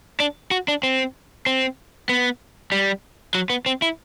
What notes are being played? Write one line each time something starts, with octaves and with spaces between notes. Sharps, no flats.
D4
F#4
D4
C4
C4
B3
G3
F#3
B3
C4
E4